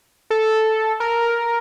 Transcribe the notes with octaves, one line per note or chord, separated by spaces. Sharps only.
A4
A#4